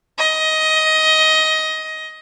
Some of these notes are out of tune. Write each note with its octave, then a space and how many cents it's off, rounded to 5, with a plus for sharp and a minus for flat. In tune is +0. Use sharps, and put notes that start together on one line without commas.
D#5 +15